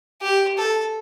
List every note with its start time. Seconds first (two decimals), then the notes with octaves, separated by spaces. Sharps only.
0.22 G4
0.58 A4